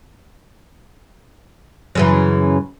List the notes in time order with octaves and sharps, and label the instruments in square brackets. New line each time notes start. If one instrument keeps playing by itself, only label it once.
[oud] F#2 C#3 E3